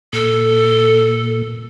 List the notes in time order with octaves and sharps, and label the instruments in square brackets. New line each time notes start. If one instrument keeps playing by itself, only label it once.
[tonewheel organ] A#2 [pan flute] A4